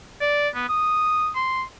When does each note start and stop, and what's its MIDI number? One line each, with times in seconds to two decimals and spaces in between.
0.21 0.48 74
0.55 0.68 59
0.69 1.29 87
1.36 1.63 84